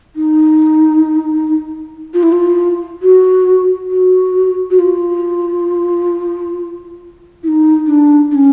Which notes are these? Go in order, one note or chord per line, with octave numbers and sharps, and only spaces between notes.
D#4
F4
E4
F4
F#4
F#4
F#4
F4
E4
D#4
D4
D4
C#4